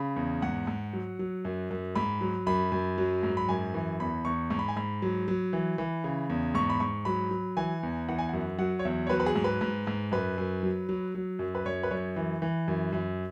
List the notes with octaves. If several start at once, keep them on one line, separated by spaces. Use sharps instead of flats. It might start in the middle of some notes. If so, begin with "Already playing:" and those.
Already playing: C#3 B5
E2
G#2 F#5
G#2
F#3
F#3
F#2
F#2
G#2 B5
F#3
F#2 B5
F#2
F#3
G#2
B5
F#2 G#5
E3
E2 B5
E2 C#6
G#2 C#6
B5
G#5
G#2 B5
F#3
F#3
E3
E3
C#3
E2
G#2 C#6
B5
G#2 C#6
F#3 B5
F#3
E3 G#5
E2
E3 F#5
G#5
F#2 F#5
F#3 F#5
C#5
E2 E5
C#5
F#3 B4
B4
G#4
G#2
B4
G#2
G#2
F#2 B4
F#2
F#3
F#3
F#3
F#2
B4
F#2 C#5
B4
F#2 C#5
E3
E3
F#2
F#2